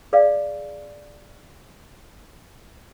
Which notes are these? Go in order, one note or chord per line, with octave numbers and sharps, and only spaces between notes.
G#4 D5 F5